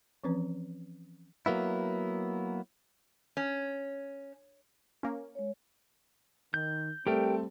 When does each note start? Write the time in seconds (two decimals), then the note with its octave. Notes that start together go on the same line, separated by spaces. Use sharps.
0.24 E3 F3 C4 C#4 B4
1.46 F#3 A#3 B3 E4
3.37 C#4
5.03 A#3 C#4
5.35 G#3 C#5
6.54 D#3 G6
7.07 G3 A3 C4 G4 A#4 G5